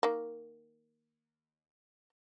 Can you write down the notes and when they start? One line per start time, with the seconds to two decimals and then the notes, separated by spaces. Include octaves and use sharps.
0.03 D#3 A#3